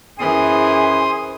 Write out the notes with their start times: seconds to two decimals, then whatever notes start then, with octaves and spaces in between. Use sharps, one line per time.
0.19 F#2 E3 G#4 C5 C6 D#6